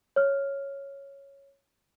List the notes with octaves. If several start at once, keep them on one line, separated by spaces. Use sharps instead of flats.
C#5 F6